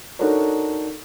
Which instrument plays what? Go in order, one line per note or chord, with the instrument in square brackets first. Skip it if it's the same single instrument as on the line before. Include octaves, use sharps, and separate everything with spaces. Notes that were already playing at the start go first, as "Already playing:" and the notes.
[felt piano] D4 D#4 F#4 A4 A#4 C#5